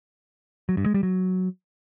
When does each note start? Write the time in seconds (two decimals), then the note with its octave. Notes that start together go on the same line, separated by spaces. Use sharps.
0.69 F#3
0.77 G2
0.86 G#3
0.94 G3
1.03 F#3